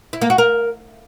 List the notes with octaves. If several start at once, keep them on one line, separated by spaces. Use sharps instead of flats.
E4
A#3
F#4
A#4